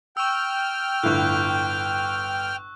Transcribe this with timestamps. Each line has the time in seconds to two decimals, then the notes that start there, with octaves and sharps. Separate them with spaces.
0.17 G5 C#6 E6 F6
1.03 G1 A2 C#6 F#6